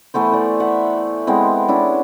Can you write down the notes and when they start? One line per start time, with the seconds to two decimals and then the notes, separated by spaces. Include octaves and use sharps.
0.14 E3 A3 B3 C5
0.32 E3 D5
0.60 E5 F#5
1.27 G#3 B3 C4 E4
1.68 C#4 D4 E4